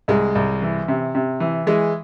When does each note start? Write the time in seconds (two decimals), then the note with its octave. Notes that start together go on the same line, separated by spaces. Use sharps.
0.08 C2 G#3
0.35 C2
0.62 E3
0.88 C3
1.15 C3
1.40 E3
1.67 E3 G#3